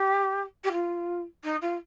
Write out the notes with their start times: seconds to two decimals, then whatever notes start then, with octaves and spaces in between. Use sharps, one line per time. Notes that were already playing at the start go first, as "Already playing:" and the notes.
Already playing: G4
0.64 G4
0.72 F4
1.44 D#4
1.62 F4